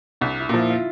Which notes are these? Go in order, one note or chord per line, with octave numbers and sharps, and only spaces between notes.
C2 D4
E4
A#2 F3
E4
F4